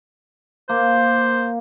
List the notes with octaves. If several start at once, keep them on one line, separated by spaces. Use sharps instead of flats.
A#3 C5